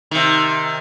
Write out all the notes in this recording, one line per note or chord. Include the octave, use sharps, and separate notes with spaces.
C3 D#3